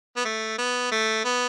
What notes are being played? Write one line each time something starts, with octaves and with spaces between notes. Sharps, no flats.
B3
A3
B3
A3
B3